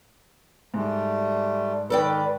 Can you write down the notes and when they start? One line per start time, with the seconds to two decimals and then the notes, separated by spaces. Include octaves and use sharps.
0.74 G#2 G3 A3
1.90 D#3 A4 B4 D5 G5